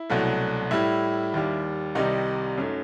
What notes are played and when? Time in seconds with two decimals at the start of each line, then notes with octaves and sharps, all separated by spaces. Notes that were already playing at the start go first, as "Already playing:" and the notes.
Already playing: E4
0.10 C2 B2 F#3 A3
0.71 A2 G3 E4
1.34 D#2 D#3 G3
1.95 C2 C3 D#3 G3 D#4
2.58 F#2 F#3 A3